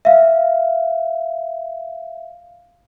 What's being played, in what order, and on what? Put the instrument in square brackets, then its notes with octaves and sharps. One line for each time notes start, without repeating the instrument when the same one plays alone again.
[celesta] E5 F5